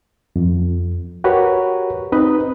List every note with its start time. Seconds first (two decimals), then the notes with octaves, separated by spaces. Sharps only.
0.36 F2
1.24 F#4 G4 A#4 B4 C#5
2.12 C4 D#4 B4 D#5